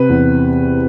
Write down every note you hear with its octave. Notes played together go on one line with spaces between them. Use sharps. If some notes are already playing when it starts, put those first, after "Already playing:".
Already playing: C3 B4
E2